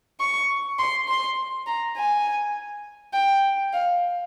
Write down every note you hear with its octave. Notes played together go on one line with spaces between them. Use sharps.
C#6
C6
C6
A#5
G#5
G5
F5